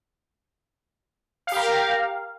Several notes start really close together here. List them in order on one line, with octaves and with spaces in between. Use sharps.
F5 G4 A#4